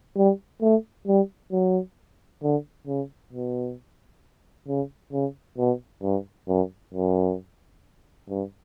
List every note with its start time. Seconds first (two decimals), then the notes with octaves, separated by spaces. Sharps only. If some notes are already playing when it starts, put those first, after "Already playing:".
0.16 G3
0.62 A3
1.07 G3
1.52 F#3
2.43 D3
2.87 C#3
3.33 B2
4.68 C#3
5.12 C#3
5.58 B2
6.03 G2
6.48 F#2
6.94 F#2
8.29 G2